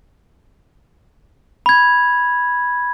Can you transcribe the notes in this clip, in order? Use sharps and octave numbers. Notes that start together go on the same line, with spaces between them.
B5 G#6